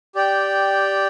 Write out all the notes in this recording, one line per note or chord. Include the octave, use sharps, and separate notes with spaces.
G4 D5 G5